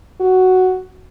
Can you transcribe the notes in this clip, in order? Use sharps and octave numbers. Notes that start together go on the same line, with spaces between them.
F#4